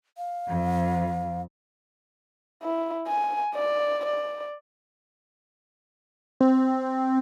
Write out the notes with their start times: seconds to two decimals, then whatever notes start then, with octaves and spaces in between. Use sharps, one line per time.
0.18 F5
0.48 F2
2.63 E4
3.07 G#5
3.55 D5
4.06 D5
6.40 C4